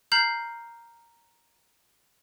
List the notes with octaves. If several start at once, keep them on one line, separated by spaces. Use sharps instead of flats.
A#5 F6 G6 C7 F#7